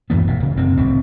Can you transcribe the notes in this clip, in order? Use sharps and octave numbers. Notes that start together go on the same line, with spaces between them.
F#2 A#2 E3 B3
E1 B2
D1 C#3
F#1 C3 C4
D1 C2 G3 C4